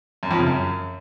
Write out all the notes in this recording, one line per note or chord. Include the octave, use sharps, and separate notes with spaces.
F#2
F2
C#3
F#2